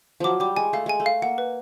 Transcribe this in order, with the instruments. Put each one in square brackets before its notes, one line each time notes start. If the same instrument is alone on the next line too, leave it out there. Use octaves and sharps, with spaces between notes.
[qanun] F3 F#3 [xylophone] D6
[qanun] G3 [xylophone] D6
[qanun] G#3 [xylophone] G#5
[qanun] A3 [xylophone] F5
[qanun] G#3 [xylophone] G#5
[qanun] A3
[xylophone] F5
[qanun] A#3 [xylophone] F#5
[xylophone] B4